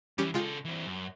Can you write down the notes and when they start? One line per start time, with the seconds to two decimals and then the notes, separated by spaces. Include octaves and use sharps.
0.18 C#2 E3 G3 C#4 G4
0.34 C#3 G#3 F4 A4 G5
0.65 E3 C4
0.86 F#2